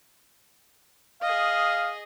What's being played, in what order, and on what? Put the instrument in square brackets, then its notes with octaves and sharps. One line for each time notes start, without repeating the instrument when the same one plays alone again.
[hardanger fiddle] G#4 D#5 [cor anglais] F5